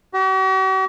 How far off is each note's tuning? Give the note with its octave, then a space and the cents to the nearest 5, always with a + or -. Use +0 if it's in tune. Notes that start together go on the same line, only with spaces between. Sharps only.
F#4 +45